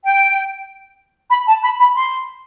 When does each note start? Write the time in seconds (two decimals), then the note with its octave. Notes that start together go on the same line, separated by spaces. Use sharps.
0.04 G5
1.31 B5
1.47 A5
1.62 B5
1.79 B5
1.95 C6